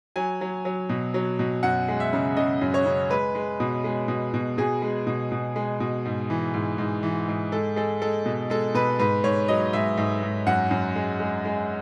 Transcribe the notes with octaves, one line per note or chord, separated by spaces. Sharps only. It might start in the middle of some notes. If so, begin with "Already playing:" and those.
F#3 G#5
F#3
F#3
B2
F#3
B2
F#2 F#5
G#3
E5
C#3
C#3 D#5
F#2
C#5
C#3
G#3 B4
G#3
B2
G#3
B2
B2
B2 G#4
G#3
B2
B2
G#3
B2
G#2
E3
G#2
G#2
E3
G#2
G#3 A4
G#3 A4
G#3 A4
B2
G#3 A4
B2 B4
G#2 B4
G#2 C#5
F#3 D#5
G#2 E5
G#2
G#2
F#2 F#5
F#2
G#3
G#3
G#3